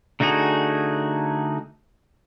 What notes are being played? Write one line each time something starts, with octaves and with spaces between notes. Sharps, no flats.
D3 A3 D#4 F#4 G#4